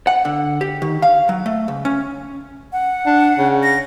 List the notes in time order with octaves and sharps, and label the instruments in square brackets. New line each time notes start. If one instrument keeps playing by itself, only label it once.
[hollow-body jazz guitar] F#5
D3
G4
D#3
F5
F#3
A3
C#2
C#4
[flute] F#5
[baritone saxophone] D4
C#3
[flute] A#6